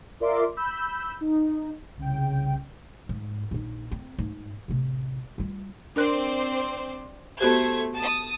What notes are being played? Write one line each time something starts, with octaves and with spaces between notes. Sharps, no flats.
F4 A#4 D5 E5 C6 D6
B5 E6 G6
D#4
C2 C#3 G5
G#2
A#1 D#4
C4
G#2
A1 C3
G3 F4
C4 D4 A#4 C5 D5 F#6
A3 B3 F#4 G4 C5 G#6
A5 D#6